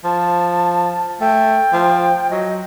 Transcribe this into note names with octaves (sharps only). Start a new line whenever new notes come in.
F3 A5
A3 G5
F3
F#3 D#5